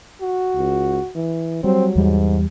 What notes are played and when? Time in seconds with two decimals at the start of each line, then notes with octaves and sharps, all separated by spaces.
0.22 F#4
0.56 C#2
1.15 E3
1.64 F#3 G3 C4
1.96 E2 G#2 G3